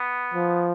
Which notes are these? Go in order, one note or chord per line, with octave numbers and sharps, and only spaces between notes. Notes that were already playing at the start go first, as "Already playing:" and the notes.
Already playing: B3
F3